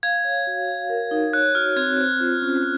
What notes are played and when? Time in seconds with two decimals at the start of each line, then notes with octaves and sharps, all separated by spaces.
0.03 F5 G#6
0.24 C#5
0.47 F#4
0.68 F5
0.90 A#4
1.11 D#4
1.33 C#5 F#6
1.55 F#4 F6
1.76 C4 G#6
1.98 C5
2.20 F4
2.42 C#4